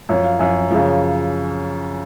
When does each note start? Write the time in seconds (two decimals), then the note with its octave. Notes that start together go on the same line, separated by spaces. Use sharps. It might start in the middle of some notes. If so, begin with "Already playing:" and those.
0.09 F#2 F3 C#5
0.24 F5
0.39 F#2 F3 G#5
0.71 F#2 C#3 F3